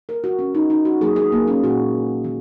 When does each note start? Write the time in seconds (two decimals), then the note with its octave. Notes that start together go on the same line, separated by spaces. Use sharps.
0.09 A#4
0.24 F#4
0.39 C#3 G#3 C#4
0.55 D#4
0.70 D#4
0.85 F#4
1.01 D#3 F#3 A#3 G#4
1.16 G#4
1.32 A#3
1.48 C#4
1.63 A#2 G#3 F#4
2.24 D#3